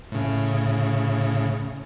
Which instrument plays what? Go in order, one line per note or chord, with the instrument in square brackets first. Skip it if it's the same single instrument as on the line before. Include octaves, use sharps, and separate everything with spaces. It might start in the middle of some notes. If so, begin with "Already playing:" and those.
[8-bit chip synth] A2 C#3